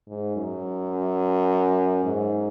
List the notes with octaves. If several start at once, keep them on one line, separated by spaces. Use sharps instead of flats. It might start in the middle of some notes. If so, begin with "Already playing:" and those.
G#2
F#2
G#2